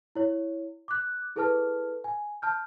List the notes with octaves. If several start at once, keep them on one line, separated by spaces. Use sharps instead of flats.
E4 C#5
D6 F#6
E4 G#4 A4 B4 A5 F6
G#5
A5 F6 G6